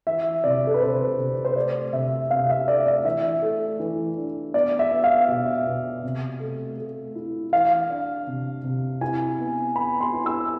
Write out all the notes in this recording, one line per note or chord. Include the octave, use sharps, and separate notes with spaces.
E3 E5
C3 D5
A4
B4
C3 C5
C3
C5
A3 D5
C3 E5
C3 F5
E5
A3 D5
D5
E3 E5
A3
E3
D4
B3 D5
E5
B3
F5
B2 E5
B2
C3
A3
A3
E4
E3 F5
D4
C3
C3
E4 G#5
B3
B3 B5
C6
E4
E6